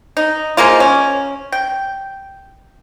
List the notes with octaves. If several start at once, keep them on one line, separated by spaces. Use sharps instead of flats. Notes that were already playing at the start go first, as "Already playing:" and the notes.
D#4
F3 G#3 A#3 F4
C#4
G5